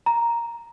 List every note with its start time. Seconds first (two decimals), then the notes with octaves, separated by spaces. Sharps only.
0.06 A#5